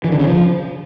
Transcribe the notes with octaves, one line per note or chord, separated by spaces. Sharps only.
E3
D3
C#3
F3